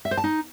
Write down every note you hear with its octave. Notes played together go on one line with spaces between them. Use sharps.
E5
C5
A5
D#4